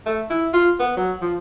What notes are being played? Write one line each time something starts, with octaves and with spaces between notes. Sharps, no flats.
A3
E4
F4
B3
F#3
F3